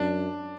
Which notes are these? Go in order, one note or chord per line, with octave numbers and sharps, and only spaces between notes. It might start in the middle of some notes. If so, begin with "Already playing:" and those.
Already playing: F#2 D4